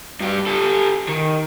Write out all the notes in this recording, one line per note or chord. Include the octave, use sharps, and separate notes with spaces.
G2 G4
G4 A4
D#3